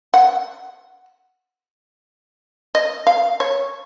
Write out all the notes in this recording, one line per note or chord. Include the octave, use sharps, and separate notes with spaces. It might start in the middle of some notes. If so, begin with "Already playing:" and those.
F#5
D#5
F5
C#5